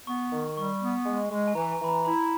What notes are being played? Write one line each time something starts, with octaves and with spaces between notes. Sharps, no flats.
B3 C#6
D#3
G3 C#6
B3
G#3
G#3
G#5
E3 A#5
G#5
E3 B5
A#5
E4 B5